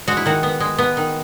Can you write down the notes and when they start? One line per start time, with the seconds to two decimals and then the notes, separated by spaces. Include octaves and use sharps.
0.07 G#3 F#4
0.17 E4
0.26 D#3 F#4
0.43 B3
0.60 G#3
0.78 B3
0.97 D#3